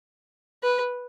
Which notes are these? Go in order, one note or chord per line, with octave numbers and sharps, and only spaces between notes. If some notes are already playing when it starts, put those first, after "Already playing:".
B4